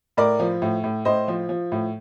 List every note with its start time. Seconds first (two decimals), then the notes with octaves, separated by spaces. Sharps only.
0.17 A2 A#4 D5
0.40 F3
0.62 A2
0.84 A2
1.05 A2 C5 D#5
1.28 F3
1.49 F3
1.72 A2